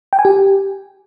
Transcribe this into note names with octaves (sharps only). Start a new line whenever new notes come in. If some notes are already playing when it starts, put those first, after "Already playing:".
G5
G#5
G4